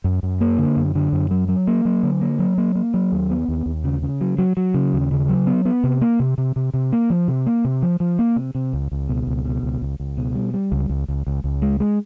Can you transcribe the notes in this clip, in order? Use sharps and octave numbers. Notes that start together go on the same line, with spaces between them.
F#2
F#2
A#3
D3
F#2
D3
F#2
F#3
F#3
A#3
F#3
D3
A#3
F#3
A#3
A#3
F#3
D#2
B3
D#2
D#2
C#3
C#3
F#3
F#3
F#3
C#3
D#2
C#3
F#3
B3
B3
C3
A#3
C3
C3
C3
C3
A#3
F3
C3
A#3
C3
F3
F3
A#3
C3
C3
C#2
C#2
B2
C#2
B2
C#2
C#2
C#2
B2
G3
G3
C#2
C#2
C#2
C#2
C#2
G#3
G#3